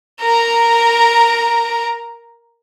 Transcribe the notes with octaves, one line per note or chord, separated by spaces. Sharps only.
A#4 A#5